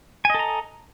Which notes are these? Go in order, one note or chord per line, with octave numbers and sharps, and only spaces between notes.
A4 D#5 G#5 A#5